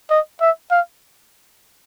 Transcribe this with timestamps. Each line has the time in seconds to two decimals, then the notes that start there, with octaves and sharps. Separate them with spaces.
0.11 D#5
0.41 E5
0.71 F5